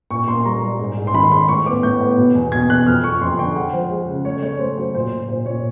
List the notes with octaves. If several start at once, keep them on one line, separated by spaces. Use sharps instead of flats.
A#2 C#6
A#3 C6
G3 A#5
G3
G#2
G#2
C6
D#3 B5
G#3 C6
A2 C#6
B3 D6
A2 G6
B3
B2
E2
B2 G#6
E2 F#6
F2 F6
F2 C#6
F2 C6
D3 G5
G#3 F#5
F3 C5
G#3
C#3
A3 C#5
A3 C#5
A3 C5
F#3 C5
A#2 C5
A#2
A#2 C5
A#2 C#5